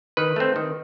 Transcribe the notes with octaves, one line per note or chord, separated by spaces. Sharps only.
D#3 B4
A3 C4
D#3